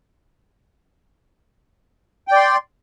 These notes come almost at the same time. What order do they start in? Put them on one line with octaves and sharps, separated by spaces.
G5 D5 C6